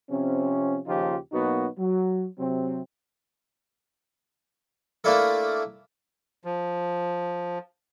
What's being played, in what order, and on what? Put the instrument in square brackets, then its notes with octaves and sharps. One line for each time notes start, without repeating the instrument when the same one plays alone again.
[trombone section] C3 F3 C4 C#4
D#2 C#3 F3 D#4 F4 G4
B2 F#3 A#3 B3 D#4 F#4
F#3
C3 F#3 C4
[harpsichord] A3 A#3 D4 E4 F4 A4
[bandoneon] F3